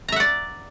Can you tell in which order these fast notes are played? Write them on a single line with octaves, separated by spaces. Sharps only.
A#5 E5 F#5 D5